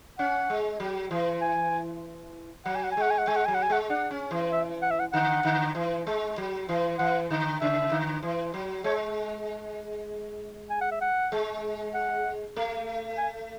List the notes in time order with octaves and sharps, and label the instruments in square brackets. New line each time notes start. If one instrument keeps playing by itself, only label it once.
[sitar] C#4 [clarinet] F#5
[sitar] G#3
F#3
E3
[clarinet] G#5
[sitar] F#3 [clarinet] F#5
[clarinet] G#5
F#5
G#5
[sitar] G#3 [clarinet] F#5
[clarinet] G#5
F#5
[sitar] G#3 [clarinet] G#5
[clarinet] F#5
[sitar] F#3 [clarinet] G#5
[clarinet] F#5
G#5
[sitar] G#3 [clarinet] F#5
[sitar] D4 [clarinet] F#5
[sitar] C#4
E3
[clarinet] E5
F#5
E5
F#5
[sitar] D3 [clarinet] F#5
[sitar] D3
E3
G#3
F#3
E3
[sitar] E3 [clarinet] F#5
[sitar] D3
[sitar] C#3 [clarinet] E5
[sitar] D3
E3
F#3
[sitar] G#3 [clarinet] C#5
[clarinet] G#5
F#5
E5
F#5
[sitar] G#3
[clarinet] F#5
[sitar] A3
[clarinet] G#5